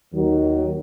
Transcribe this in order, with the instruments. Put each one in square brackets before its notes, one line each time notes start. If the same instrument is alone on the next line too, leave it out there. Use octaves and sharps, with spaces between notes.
[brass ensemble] D#2 D#3 F#3